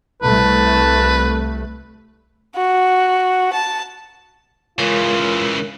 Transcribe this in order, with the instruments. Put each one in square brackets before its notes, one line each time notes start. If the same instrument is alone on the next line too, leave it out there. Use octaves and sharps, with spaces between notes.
[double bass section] C2 A3 [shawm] B4 [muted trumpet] A5
[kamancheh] F#4
A5
[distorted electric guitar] C#3 E3 [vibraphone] G#3 A#4 C#5 [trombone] F4